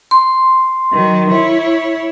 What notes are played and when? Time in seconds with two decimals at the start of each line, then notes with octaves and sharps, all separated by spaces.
0.11 C6
0.92 D#3 F#3
1.30 E4 C#5